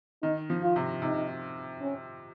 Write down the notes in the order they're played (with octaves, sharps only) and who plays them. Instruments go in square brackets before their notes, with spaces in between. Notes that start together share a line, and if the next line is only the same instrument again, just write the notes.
[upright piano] D#3 [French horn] D#4
[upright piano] F3
[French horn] F4
[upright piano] C3
[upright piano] C3 [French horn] D#4
[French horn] C#4